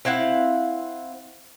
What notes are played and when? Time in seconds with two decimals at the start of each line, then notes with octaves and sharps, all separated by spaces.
0.05 C4 E4 F5 F#5